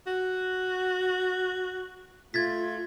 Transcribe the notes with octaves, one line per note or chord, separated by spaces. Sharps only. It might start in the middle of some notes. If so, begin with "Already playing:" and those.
F#4
A3 F4 G#6 A6 B6